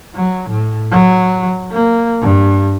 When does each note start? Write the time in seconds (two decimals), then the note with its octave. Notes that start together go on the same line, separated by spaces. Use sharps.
0.15 F#3
0.49 A2
0.92 F#3
1.72 A#3
2.22 G2